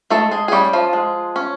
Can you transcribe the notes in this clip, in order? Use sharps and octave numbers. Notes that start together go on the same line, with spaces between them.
G#3 A3 A4
G#3 G#4
G#4
G3 C#4 G4
F3 F4
G#3
C#4